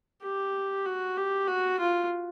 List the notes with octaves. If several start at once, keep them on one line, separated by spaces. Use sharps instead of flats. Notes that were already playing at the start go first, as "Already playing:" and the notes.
G4
F#4
G4
F#4
F4